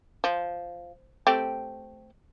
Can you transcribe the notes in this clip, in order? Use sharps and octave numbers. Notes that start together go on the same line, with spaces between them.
F3
A3 C4 G4